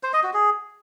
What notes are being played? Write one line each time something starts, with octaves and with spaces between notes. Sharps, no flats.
C5
D#5
F#4
G#4